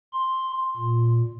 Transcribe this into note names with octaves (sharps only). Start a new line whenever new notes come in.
C6
A#2